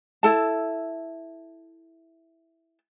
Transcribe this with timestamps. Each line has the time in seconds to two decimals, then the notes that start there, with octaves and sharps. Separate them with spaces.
0.23 E4 A4 A5